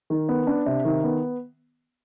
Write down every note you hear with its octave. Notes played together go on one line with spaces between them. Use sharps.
D#3
B3
D4
C3
D#3
B3